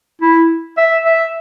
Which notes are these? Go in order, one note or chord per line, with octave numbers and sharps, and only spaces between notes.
E4
E5
E5